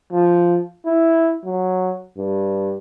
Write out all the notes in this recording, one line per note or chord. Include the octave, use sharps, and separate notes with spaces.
F3
E4
F#3
G2